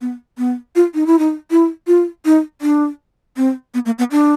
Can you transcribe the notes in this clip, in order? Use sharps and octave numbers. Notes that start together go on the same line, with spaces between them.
B3
B3
F4
D#4
E4
D#4
E4
F4
D#4
D4
C4
B3
A#3
B3
D4